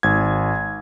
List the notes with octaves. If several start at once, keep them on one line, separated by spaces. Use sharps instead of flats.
G#1 G#6